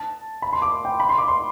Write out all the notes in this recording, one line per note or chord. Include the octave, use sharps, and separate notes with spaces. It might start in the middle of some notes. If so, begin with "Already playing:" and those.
Already playing: A5
B5
C6
D6
G5
B5
C6
D6
C6